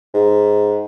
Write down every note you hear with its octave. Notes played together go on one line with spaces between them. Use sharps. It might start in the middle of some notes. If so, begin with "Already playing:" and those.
G#2